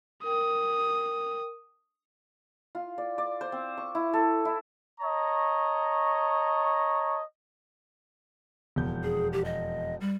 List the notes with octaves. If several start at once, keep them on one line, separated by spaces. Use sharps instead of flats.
A#4 G5 D#6
F4
D5
D5
C5
C4
C#6
E4
A4
E4
C#5 D#5 A5 A#5 C#6
E1 F2 G6
G#4
G4
D#5
G3